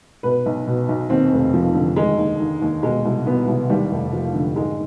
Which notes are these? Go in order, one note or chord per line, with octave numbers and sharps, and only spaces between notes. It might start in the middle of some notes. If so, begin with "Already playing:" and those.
B2 B4
B1
B2
B1
D#2 C4
F1
F3
D3
D#3 G#3
D#2
D#3
D#2
B2 G#3
C2
B2 B3
C2
D#2 G3
F1
F3
D3
G#2 G#3